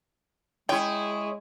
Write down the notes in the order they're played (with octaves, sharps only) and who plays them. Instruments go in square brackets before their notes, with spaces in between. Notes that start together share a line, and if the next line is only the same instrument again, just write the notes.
[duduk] G#3 [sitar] E4 C#5 [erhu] G#4 [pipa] G5